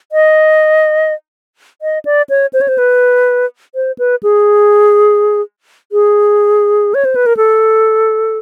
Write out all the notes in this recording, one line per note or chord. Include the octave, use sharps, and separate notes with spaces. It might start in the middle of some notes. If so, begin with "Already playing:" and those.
D#5
D#5
D5
C#5
C5
C#5
C5
B4
C5
B4
G#4
G#4
C#5
C5
B4
A#4
A4